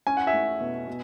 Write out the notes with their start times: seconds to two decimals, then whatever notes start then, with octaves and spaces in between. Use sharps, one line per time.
0.07 C#4 G#5
0.17 F#5
0.27 E5 G#5
0.33 A3
0.61 B2
0.88 B2